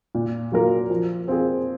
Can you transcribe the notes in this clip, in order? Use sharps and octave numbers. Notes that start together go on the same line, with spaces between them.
A#2
F#3 A#3 F4 A#4
F3
C4 F4 G#4